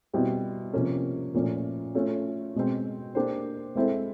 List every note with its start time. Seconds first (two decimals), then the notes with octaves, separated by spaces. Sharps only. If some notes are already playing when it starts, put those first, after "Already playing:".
0.13 B2 G3 C4 E4 G4
0.73 C3 F3 A#3 C#4
1.34 A#2 F3 A3 C#4
1.95 A3 C#4 F4 A4 C#5
2.55 B2 G#3 C4
3.15 A#3 D4 G4 C5
3.75 G#3 C4 E4 A4 C5